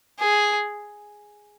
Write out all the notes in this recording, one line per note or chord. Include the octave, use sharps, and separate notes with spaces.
G#4